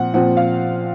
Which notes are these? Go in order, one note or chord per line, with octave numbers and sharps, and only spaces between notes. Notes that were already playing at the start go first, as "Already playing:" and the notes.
Already playing: A#2 F3 C4 F#5
A#2 F3 C4 F#5
F5